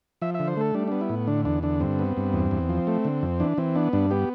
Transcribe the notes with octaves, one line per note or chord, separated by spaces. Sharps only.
F3 E5
D3 E5
C5
A3 A4
G3 D4
B3 D4
E4
A2
D3 D4
E2 D4
D3 D4
G2 C4
B3
G2
E2
E2
F3
A3
D3
F2
E3 D4
E3 C4
B3 D4
G2 D4
B3 G4